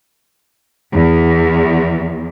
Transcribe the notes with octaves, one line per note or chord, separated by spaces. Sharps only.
E2